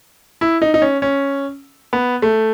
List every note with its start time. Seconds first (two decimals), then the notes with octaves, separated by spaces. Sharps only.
0.41 E4
0.62 D#4
0.74 D#4
0.82 C#4
1.02 C#4
1.93 B3
2.22 A3